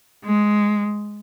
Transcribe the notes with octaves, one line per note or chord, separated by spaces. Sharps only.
G#3